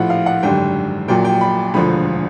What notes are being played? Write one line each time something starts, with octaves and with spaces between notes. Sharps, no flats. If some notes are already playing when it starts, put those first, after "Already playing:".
Already playing: A#1 A2 F3 F#5
F5
F#5
G#1 F#2 D3 G3 G5
A#1 A#2 F#3 G5
G5
B5
E1 D2 D3 F3 B5